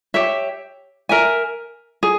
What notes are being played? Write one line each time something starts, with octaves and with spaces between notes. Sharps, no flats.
G4 C#5 E5
A#4 E5 G#5
G#4